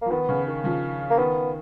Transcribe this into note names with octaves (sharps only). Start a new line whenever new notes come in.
F3 A#3
D#3 B3
C#3
D#3
C#3 F3
A#3
D#3 B3